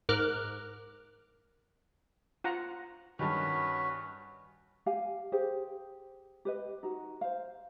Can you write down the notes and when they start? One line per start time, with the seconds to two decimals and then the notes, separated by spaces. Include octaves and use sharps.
0.09 G#2 A#4 D6 F6 F#6
2.44 F4 F#5 A#5
3.19 G2 D#3 C#4 F#4 B4
4.86 G4 F5 G#5
5.32 G4 G#4 C5
6.45 G4 B4 D#5
6.83 D#4 F#4
7.21 C5 F5